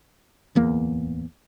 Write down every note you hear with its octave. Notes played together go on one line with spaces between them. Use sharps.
D1 E2 A#3